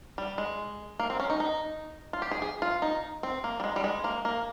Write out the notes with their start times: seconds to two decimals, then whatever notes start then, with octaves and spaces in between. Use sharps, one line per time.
0.18 G3
0.38 G#3
0.99 A#3
1.10 C4
1.20 C#4
1.30 D#4
1.40 D#4
2.13 F4
2.22 G4
2.31 G#4
2.42 G#4
2.62 F4
2.82 D#4
3.23 C4
3.44 A#3
3.60 G3
3.64 G#3
3.76 G3
3.84 G#3
4.04 A#3
4.25 A#3